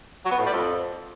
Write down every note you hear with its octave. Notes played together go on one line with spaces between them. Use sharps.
F#3
B3
A2
G3
F2